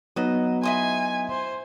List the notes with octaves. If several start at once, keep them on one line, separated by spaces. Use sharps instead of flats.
F#3 B3 D#4 F#4 D#5
E4 D#5 G#5 C6
C5